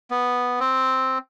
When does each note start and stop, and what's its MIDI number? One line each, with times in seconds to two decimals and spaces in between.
0.11 0.59 59
0.59 1.18 60